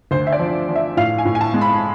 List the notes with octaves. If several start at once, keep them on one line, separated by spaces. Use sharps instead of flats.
D2 C5
E5
D5
F3
F3
E5
A2 F5
G#5
A2
G#5
A5
G#3
B5